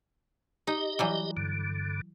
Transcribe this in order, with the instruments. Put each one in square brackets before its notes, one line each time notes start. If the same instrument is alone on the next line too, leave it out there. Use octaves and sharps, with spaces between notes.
[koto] D#4 [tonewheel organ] G4 D#5
[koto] E3 F#3 G3
[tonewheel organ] G2 D3